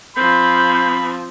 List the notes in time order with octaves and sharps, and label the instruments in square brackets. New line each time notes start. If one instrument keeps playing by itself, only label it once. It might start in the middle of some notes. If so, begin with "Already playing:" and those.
[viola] F3 C4 [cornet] B5 [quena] G6